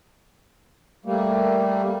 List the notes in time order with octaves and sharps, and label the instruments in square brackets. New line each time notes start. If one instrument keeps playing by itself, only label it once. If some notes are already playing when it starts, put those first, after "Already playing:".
[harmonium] G3 A3 A#3